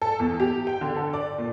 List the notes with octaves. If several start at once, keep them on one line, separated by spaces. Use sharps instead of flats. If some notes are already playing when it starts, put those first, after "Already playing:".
A4
E2
G4
G5
D3
A4
D5
A#2